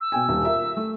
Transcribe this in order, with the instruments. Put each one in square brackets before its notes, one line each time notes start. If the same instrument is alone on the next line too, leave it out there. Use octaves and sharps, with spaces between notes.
[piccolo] E6
[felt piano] B2 G5 G#5
D#1 G3
F4 A#4 E5
A3